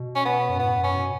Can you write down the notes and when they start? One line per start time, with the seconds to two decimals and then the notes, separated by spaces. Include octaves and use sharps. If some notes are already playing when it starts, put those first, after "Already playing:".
Already playing: B2
0.15 C#4
0.25 B3
0.49 F#2
0.60 A2 B3
0.77 F#2
0.84 C#4
0.95 B2